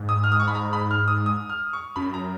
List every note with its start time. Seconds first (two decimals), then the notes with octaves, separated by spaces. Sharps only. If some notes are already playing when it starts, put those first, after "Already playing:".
Already playing: G#2
0.09 D#6
0.24 F6
0.32 D#6
0.40 C#6
0.48 B5
0.55 A#5
0.73 B5
0.91 F6
1.08 D#6
1.26 D#6
1.50 F6
1.73 C#6
1.96 F#2 B5
2.14 A#5